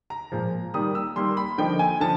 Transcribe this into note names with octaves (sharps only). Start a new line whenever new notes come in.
A#5
A#2 F3 G#3
D#3 G3 A#3 D#6
E6
D#3 G3 A#3 C6
B5
D3 F3 A#3 D#4 G5
G#5
D3 F3 A5